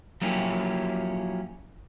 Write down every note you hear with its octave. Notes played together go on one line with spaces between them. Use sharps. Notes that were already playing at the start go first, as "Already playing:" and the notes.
F3 F#3 A#3 C#4 E4 G4